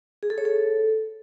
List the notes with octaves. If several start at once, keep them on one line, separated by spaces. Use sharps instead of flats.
G#4
A4
C#5
A4